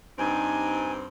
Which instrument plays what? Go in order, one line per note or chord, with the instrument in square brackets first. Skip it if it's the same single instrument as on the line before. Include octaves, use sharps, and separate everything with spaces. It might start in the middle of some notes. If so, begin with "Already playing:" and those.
[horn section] G2 C4 [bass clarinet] D#4 [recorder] G#5